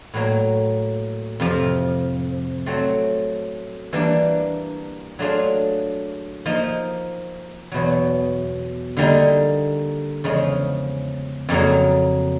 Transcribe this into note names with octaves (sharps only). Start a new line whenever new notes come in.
A2 F#3 A#3
F2 C3 F3
F#3 A3 C4
E3 G3 A#3 D4
F#3 A3 D4 F4 G#4
F3 A#3 D#4
E2 B2 F#3
D3 G3 A#3 D#4
E2 C#3 F3 G#3
F2 C#3 F#3 A#3 C#4